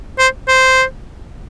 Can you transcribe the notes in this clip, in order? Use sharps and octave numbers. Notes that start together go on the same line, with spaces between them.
C5
C5